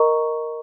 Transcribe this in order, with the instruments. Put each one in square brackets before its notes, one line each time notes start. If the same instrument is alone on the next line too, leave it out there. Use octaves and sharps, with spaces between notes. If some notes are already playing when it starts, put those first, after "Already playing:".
Already playing: [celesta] A#4 D#5 A#5 C#6